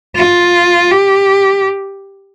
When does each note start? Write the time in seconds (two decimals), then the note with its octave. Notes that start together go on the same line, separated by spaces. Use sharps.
0.16 F4
0.92 G4